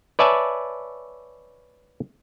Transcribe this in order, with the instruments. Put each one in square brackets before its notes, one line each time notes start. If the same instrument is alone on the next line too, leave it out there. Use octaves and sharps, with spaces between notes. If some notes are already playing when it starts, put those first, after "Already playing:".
[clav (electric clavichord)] B4 C#5 D5 E5 G#5 A5